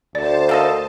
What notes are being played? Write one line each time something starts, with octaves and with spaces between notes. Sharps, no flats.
D2 C5 D5 A5
A#3 A4 D#5